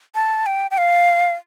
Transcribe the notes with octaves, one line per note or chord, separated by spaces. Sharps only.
A5
G5
G5
F5